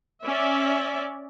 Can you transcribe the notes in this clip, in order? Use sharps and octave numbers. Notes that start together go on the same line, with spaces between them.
C#4 D5 E5